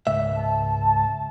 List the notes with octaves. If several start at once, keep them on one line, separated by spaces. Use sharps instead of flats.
C#2 G#2 E5
A5